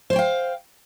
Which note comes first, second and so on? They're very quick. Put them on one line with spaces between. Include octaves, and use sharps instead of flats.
C5 C#5 G5 F5